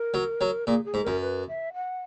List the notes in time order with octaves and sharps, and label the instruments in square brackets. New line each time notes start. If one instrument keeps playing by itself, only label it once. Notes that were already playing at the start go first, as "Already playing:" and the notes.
Already playing: [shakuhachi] A#4
[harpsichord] F#3
F#3
[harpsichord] A#2 [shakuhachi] G#4
[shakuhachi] G#4
[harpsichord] G#2
[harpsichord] F#2 [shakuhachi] A#4
[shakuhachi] B4
E5
F#5